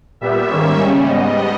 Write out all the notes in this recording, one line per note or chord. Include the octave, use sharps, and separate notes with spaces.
A#2 G3 B3 E5
G#2 D#3 G3 A#3 C#4
C#3 G3 C#4
G#2 G3 B3 D#5